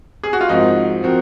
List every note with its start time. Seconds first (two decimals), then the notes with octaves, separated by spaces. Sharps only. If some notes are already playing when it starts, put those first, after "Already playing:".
0.23 G#4
0.33 F#4
0.41 F4
0.49 G#2 F3 C4 D#4 F#4 A#4
1.03 F3 C4 F#4 A#4